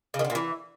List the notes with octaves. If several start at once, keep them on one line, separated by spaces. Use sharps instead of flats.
C#3
D#3
D3
A#2
E3